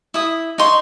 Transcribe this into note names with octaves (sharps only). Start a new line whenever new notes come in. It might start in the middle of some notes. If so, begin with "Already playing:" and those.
E4 D#6
D#4 C6 C#6